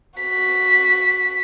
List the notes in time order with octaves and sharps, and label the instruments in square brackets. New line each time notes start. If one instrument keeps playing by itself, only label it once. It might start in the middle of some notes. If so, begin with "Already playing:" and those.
[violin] F#4 B6